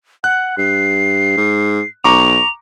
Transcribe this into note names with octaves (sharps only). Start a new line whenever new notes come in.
F#5 F#6
G2 C7
G#2
B1 A#5 C#6 D6 F7